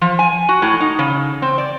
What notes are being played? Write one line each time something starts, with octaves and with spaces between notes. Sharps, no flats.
F3
G#5
F#4
A2
D#4
C#3
C4
D5